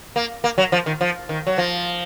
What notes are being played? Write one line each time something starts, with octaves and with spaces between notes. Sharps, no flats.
A#3
A#3
F#3
F3
D#3
F3
D#3
F#3
F3